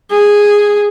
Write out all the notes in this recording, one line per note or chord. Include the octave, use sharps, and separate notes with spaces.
G#4